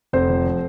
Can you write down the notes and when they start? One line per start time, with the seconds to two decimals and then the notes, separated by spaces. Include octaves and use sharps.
0.13 F1 C4 C5
0.29 F3
0.45 F3